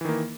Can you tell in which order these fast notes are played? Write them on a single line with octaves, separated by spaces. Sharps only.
E3 D#3 A#3